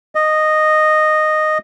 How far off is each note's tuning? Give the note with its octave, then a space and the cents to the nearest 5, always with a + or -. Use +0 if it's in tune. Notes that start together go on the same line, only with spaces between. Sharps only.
D#5 -10